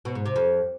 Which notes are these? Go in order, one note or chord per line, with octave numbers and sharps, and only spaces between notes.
B2
G#2
C3
F2